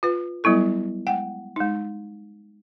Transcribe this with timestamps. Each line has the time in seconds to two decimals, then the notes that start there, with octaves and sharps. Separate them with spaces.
0.03 F4 B4
0.44 F#3 G3 B3 E4 A4
1.07 G#3 F#5 G5
1.56 G#3 D#4